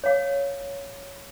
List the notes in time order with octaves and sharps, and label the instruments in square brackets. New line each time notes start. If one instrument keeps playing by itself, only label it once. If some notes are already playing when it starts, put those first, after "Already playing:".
[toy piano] C#5 F5